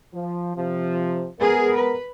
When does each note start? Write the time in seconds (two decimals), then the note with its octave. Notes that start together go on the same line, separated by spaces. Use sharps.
0.14 F3
0.56 C3 F3
1.40 G#3 B3 G#4 A#4
1.74 B4